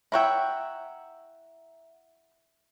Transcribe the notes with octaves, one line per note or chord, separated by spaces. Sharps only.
E4 C#5 E5 F#5 G5 A#5